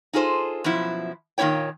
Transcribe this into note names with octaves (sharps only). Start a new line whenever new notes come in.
D#4 F4 G#4 A4 C5
F#2 B2 F3 E4
A#2 D#3 A#3 E4 C#5 G5